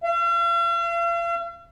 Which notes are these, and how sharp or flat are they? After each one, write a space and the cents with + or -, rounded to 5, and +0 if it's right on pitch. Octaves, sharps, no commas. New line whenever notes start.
F5 -45